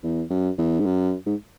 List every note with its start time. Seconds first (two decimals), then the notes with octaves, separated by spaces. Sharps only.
0.03 E2
0.30 F#2
0.58 E2
0.80 G#2
0.85 F#2
1.26 G#2